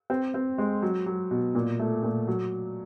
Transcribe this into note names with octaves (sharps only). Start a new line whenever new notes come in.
C4
C4
G#3
F#3
F#3
B2
A#2
A3
A#2
F#3